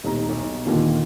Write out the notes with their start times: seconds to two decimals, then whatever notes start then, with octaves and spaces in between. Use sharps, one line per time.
0.03 D#1 B1 D#4 A#5
0.29 B1
0.65 D#2 A#2 D3 D#3